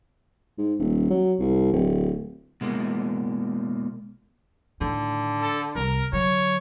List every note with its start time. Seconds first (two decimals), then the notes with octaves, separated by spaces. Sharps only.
0.58 G#2
0.79 D#1
1.10 F#3
1.39 C2
1.73 D1
2.61 B2 G#3 A#3
4.81 A2 D3 D#3
5.41 A4
5.75 C2 A#4
6.13 D3 F#3 C#5